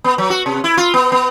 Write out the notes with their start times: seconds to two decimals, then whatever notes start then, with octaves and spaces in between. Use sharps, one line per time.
0.04 B3
0.18 F#3
0.30 F#4
0.46 C3
0.64 E4
0.77 F4
0.94 B3
1.12 B3